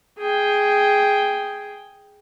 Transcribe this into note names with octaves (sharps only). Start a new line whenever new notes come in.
G#4 G5